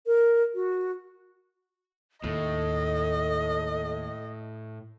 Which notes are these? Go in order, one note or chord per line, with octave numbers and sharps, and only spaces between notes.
A#4
F#4
D#2 A2 A4 D#5